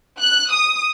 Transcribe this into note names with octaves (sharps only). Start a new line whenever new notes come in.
F#6
D#6